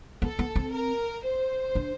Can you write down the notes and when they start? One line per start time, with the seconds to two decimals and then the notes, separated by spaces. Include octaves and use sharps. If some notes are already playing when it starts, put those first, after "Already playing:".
0.22 B3 A4
0.39 B3
0.56 C4
0.73 A#4
1.24 C5
1.75 D4